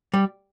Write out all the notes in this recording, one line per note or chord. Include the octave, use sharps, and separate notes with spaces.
G3